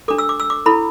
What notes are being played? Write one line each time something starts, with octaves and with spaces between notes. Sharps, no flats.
D4 A4 D6
E6
D6
E6
D6
E4 A4 B5